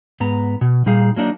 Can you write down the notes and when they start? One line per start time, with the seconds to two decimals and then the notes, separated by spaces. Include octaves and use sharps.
0.20 G#2 B3 A#5
0.61 B2
0.86 A#2 G3 D#4 G#4 F5
1.16 F#3 A#3 D4 D#4